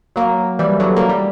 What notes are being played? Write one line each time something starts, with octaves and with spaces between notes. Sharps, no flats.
F#3 A#3
E3 G3
D3 F#3
A#3
G3